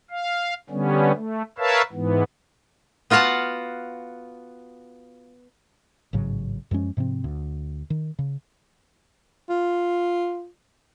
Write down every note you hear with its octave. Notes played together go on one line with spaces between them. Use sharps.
F5
D3 G3 B3 C#4
A3
A#4 B4 C#5 E5 F5 A5
G#2 E3 B3
B3 F4 F#4 F5 F#5 A5
A1 G#2 C#3 F#3
F#2 F3 G#3 C#4
G#2 C3 F3 C4
D2
D#3
C#3
F4